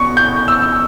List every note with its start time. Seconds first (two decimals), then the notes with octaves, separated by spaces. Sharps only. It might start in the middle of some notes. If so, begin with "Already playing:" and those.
Already playing: B2 C#6
0.17 G6
0.48 E6